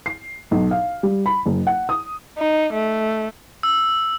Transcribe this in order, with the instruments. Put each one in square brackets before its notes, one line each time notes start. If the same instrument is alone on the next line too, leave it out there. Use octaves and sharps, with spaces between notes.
[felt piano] C7
B1
F5
G3
B5
F#1
F#5
D#6
[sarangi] D#4
A3
[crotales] E6